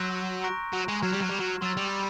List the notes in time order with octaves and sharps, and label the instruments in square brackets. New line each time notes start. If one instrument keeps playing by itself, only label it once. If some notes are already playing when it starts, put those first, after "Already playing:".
Already playing: [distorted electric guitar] F#3 [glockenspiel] C6 E6 G6 A#6
[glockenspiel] A#5 C#6 F#6 A#6 D7
[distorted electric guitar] F#3
G#3
[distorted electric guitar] F#3 [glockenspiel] F6 G#6 C7 E7
[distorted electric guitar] G3
F#3
G3
F#3
[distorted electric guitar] F#3 [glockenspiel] C6 E6 A6
[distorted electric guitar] G3